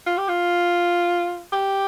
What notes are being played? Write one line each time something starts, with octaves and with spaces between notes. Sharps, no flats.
F4
G4
F4
G4